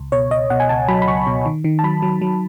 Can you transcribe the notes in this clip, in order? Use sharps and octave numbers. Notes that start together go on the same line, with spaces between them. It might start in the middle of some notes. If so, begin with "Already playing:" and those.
Already playing: C#2
B2 C#5
C#2 D#5
B2 F#5
G#5
C#2 A5
F#3 B5
B5
C#2 C#6
B2
D#3
D#3
A5
F#3 B5
F#3
F#3